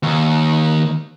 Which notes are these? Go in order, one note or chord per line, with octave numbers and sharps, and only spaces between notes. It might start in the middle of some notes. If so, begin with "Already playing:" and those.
D#2